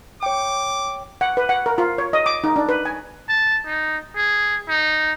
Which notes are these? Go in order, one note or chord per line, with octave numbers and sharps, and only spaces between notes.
C#5 G5 D6
F#5
B4
F#5
A#4
F4
C#5
D#5
D6
D#4
D4
B4
G#5
A5
D#4
G#4
D#4